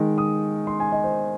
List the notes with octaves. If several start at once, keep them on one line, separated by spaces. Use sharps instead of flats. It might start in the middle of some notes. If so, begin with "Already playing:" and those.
Already playing: D#3 G#3 D#5
D#6
C6
G#5
D#5
C5